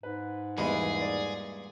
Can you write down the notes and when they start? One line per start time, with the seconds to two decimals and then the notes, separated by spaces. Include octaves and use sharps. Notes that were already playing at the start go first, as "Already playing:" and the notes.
0.03 G#2 B4
0.58 E2 G2 A#2 G#3 G#4 D#5 B5
1.01 D5